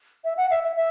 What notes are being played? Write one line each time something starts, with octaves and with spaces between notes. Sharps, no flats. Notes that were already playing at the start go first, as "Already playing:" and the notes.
E5
F#5
E5
E5
E5